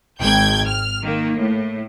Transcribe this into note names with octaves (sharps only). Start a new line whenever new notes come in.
G#1 G5 G6 G#6
F6
D#3 A#3
A2